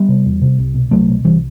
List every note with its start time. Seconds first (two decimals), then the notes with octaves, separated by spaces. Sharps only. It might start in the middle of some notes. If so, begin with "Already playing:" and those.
Already playing: G3 B3
0.08 C3
0.26 E2
0.42 C3
0.59 C2
0.74 B2
0.91 C2 F#3 A3
1.09 B2
1.24 C2 E3 G3